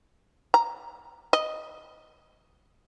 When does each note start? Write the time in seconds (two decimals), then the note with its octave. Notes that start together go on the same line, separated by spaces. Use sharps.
0.54 A#5
1.33 D#5